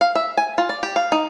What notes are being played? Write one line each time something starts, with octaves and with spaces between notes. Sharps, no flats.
F5
E5
G#5
F4
D5
G4
F5
D#4